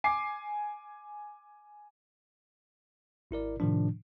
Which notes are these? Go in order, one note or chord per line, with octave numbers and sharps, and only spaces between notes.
G#5 D6 C7
G#1 E4 A#4 D5
A2 C3 D#3 F3 D4